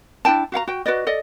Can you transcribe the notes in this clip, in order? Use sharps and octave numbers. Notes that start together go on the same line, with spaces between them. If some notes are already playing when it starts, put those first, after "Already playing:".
D4 E4 G5 A5
F#4 F5 F#5 A#5
F#4 G5
F#4 B4 D5 D#5
A4 D5 D#5